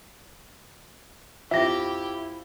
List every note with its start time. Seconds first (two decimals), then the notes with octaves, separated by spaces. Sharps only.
1.51 F2 F3 E4 G4 E5 A#6